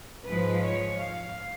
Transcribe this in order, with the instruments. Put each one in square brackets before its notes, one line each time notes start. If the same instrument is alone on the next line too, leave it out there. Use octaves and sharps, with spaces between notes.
[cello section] G#2 F3 G#3 B4
C#5
F5